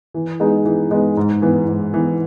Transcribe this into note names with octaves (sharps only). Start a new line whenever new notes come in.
E3
G#3 B3 D#4 G#4
E3
G#3 B3 D#4 G#4
G#2
E3 B3
G#2
E3 B3